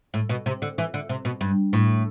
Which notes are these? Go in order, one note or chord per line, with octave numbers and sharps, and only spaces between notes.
A2
B2
C3
D3
E3
D3
C3
B2
G2
A2